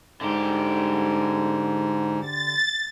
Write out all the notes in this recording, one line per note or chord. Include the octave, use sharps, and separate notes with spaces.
G#2 D3 G4
A6